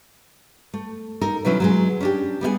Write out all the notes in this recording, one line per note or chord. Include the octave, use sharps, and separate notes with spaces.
A3
D#4 A4 A#4
B2 D#3 F#3 C#4 E4
F#3 G#3 G#4
C#4 D4 G4
G3 B3 E4 G#4